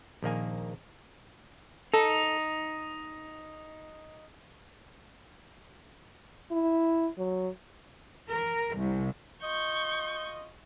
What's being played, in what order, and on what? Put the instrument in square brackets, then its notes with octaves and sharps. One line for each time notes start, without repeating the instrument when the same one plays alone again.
[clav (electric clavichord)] A#1 D#3 A#3 G#5
[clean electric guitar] D#4 [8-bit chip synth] A4
[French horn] E4
F#3
[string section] A#4
C2
[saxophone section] F4 D#5 [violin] C#6 G6